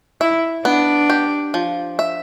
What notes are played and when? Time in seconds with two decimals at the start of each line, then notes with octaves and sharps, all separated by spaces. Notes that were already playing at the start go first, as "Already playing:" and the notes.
0.21 E4 E5
0.65 B3 D4
1.10 G4
1.54 F3
1.99 E5